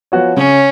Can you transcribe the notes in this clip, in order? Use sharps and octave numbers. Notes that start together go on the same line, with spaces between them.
F3 B3 F#4 C#5
C#3 C#4